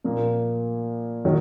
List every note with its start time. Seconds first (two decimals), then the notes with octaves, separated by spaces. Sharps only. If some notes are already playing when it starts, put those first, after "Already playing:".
0.04 A#2 F3 A#3
1.25 D#3 F#3